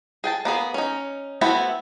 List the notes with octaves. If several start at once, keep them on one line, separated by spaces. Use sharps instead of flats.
G#4 G5 A5
A#3 B3 G#4
C#4 D#4
A3 B3 C4 E4 F#4